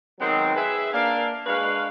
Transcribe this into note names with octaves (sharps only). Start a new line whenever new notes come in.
D#3 F#3 G#3 B3 C4
G#4 B4 E5
A#3 D4 F5
G#3 D4 F#4 B4 F5